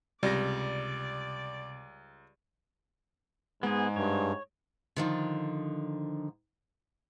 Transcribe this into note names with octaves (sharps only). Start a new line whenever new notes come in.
C#2 C3 G3 D5 A#6
G#2 G#3 B3 G#4
G2 C#5
D3 D#3 F3